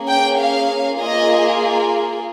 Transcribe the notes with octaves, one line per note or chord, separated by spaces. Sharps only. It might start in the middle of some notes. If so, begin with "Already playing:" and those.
Already playing: A#3 C#4 G#4
G5
F5
A#3 F4 G#4 D#5